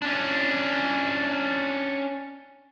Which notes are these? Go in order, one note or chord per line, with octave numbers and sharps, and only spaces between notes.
C#4 D4